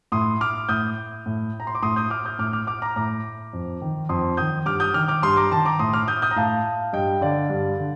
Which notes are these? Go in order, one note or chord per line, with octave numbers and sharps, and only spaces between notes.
A2 C6 D#6
D6 F6
A2 D#6 G6
A2
A#5
C6
D6
A2 C6 D#6
D#6 G6
D6 F6
D#6 G6
A2 D6 F6
D6 F6
D6 F6
A#5 D6
A2 A#5 D6
F2
D#3
F2 C6 D#6
D#3 D#6 G6
G2 D6 F6
D#6 G6
D#3 D6 F6
D6 F6
G2 C6 D#6
A#5 D6
D#3 A5 C6
A#5 D6
A2 C6 D#6
D6 F6
D#6 G6
D#6 G6
A#5
A2 F5 A5
G2 D#5 G5
D3 D5 F5
G2
D3